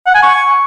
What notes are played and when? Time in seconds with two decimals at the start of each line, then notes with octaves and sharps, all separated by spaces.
0.06 F#5
0.14 G#5
0.23 C#6